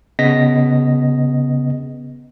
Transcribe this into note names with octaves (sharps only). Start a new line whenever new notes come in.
C#3 B3 D#5 A#6 B6